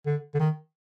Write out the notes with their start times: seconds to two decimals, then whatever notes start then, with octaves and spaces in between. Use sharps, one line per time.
0.06 D3
0.34 D3
0.40 D#3